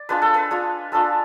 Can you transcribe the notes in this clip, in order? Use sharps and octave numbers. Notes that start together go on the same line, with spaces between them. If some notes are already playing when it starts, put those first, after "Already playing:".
Already playing: D5
G#3 D4 F4 B4
A4
B4
G#3 D4 F4
G#3 D4 F4 A4